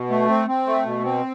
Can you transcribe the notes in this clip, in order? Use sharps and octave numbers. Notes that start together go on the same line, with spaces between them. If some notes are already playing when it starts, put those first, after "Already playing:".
Already playing: B2
A3
C4
C4
A3
B2
C4